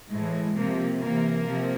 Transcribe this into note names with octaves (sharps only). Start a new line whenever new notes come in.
A2 E3 G#3
C3 F3 A#3
C3 E3 A#3
C3 F3